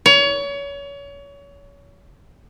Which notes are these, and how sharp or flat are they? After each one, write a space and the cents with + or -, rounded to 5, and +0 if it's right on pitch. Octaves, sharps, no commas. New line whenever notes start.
C#5 +30